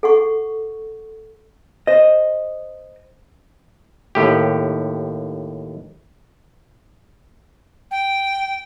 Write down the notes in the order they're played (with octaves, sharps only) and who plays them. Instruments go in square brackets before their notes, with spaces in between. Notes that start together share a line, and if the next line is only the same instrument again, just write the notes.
[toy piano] A4 F#5 C#6
[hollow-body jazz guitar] C5 D#5
[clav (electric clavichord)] D#2 A2 G4
[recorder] G5